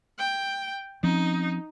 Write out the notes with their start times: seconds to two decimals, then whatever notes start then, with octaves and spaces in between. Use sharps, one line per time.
0.19 G5
1.03 F3 C4 C#4 D#4